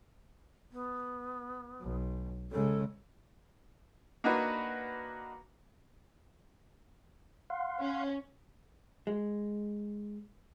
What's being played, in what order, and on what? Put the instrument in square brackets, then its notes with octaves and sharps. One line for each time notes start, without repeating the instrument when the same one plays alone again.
[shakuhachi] B3
[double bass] B1
[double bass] C#3 G#3 [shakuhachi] A4
[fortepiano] A#3 D4 D#4 F#4 B4
[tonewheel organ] F5 F#5 C6
[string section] C#4
[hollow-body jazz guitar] G#3